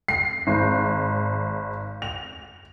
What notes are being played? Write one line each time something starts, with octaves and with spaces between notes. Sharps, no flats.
C7
G#1
F7